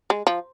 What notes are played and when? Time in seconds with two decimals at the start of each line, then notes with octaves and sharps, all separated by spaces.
0.10 G#3
0.27 F3